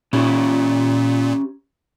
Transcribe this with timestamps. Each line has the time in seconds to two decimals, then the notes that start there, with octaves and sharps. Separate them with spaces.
0.13 A#2 C#4 G4 B5